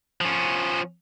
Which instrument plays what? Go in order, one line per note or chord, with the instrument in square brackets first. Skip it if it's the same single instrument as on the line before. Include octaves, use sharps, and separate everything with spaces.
[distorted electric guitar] F3 C#4